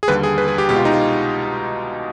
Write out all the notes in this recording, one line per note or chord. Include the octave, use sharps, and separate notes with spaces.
G#4
D#2 D3 G3 B4
G#4
B4
G#4
G4
C2 B2 G#3 G4
F4
D#4
F4